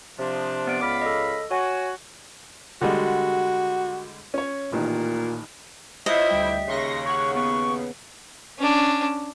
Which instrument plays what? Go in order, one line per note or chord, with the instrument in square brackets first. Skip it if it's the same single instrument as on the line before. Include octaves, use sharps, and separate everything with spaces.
[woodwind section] C3 F3 D4
[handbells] B3 D5 D7
[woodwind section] C#2 F5 B5 [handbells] D6
[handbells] A4 D#5
[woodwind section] F#4 [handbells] C#5 G#5
[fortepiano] D3 G3 G#3 [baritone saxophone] F#4
[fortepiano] C#4 C#5
[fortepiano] A1 D#3 [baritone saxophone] A#2
[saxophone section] E4 C5 [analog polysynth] F4 C#5 [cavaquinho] D#5 [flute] E5
[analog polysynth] D2 G3 G5
[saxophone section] D#2 C#3 [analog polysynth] C6 C#6 A#6
[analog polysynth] C#5 F#5 [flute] C#6
[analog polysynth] B3 [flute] C#6
[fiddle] C#4 D4